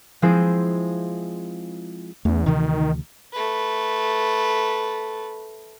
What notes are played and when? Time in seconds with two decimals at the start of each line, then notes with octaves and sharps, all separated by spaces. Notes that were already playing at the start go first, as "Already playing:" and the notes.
0.22 F3 G#3 C4 E4 G#4 C5
2.25 E2 A3 C#4
2.46 D2 C3 D#3 E3
3.32 A3 B4